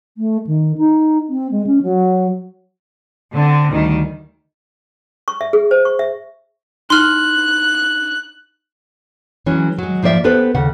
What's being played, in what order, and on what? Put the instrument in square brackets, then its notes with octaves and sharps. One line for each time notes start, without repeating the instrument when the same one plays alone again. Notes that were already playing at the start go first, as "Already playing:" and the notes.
[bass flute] A3
D#3
D#4
C4
G#3
C#4
F#3
[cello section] D3 C4
D2 D#3 G3
[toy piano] C#6
E5
G#4
C5
C#6
E5
[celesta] D#4 E4 [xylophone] C6 F6 [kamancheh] F#6
[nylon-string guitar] E3 F#3 G#3 C#4
F#3 G#3
G#2 F3 A#3 D5 E5
B3 G4 A4 B4 C5
D#2 C#3 F#5